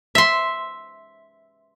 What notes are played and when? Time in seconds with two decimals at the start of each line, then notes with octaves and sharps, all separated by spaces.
0.15 E5 C6